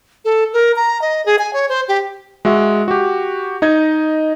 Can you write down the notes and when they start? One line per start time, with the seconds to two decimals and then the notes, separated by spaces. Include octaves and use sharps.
0.25 A4
0.53 A#4
0.76 A#5
1.02 D#5
1.26 G#4
1.39 G#5
1.53 C#5
1.69 C5
1.88 G4
2.45 G#3 F#4 E5
2.88 F#4 G4
3.62 D#4 D#5 G#6